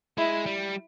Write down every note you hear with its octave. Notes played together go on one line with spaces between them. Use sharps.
G#3 E4
G3